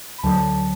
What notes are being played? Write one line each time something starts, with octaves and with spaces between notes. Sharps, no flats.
B5
D2 D3 F#3 A5